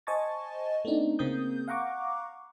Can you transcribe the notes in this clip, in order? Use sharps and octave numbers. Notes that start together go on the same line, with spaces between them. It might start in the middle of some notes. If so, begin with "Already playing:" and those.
C5 D#5 G#5 A5 C#6 A6
A3 B3 C4 D4 D#4
C#3 A#3 C4 A#4 D#6 G6
F5 F#5 A#5 C#6 D6